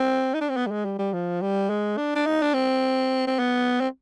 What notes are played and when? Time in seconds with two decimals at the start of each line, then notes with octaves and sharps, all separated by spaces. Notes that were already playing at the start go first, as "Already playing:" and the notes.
Already playing: C4
0.34 D#4
0.41 D4
0.49 C4
0.57 B3
0.67 G3
0.71 G#3
0.85 G3
0.99 G3
1.13 F3
1.41 G3
1.70 G#3
1.97 D4
2.16 D4
2.26 D#4
2.42 D4
2.54 C4
3.27 C4
3.39 B3
3.81 C4